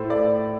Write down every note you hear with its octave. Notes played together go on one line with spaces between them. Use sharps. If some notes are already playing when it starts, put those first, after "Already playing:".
Already playing: A2 A3 C5
D5